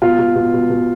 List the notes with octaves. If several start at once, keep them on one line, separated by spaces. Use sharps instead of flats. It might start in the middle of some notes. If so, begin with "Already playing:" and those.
B2 F4
B2
B2
B2
B2